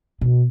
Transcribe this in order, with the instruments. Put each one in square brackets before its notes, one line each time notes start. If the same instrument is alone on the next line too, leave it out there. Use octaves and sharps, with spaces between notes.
[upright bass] B2